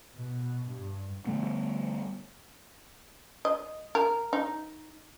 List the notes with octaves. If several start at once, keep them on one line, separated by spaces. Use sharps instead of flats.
B2
G2
D3 G3 A3 B3
D#5
A#4
D#4